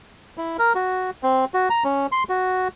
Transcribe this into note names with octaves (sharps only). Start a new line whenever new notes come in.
E4
A#4
F#4
C4
F#4
A#5
C#4
C6
F#4